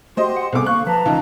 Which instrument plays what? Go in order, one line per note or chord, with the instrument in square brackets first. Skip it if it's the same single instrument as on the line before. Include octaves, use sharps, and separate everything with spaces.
[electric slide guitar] A3 [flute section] F#4 G4 C6 [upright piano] C5 D#5
[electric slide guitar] F#5
[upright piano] C2 D6 [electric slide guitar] B3 A4 C5 [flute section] G#4
[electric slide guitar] D3 A#3 [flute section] F5 C#6 [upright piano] F#6
[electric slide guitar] F3 B4 C5 [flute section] A5 A#5
[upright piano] C#2 D#4 [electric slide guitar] E3 F4